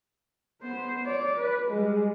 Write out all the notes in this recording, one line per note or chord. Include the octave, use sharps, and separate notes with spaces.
B3 C5
C#5 D5
B4
G3 G#3